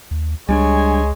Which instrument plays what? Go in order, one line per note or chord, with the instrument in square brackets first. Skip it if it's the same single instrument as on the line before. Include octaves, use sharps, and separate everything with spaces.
[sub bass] D#2
[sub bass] C#2 [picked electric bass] G3 C#4 D4 [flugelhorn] G#3 [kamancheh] C#5 G#5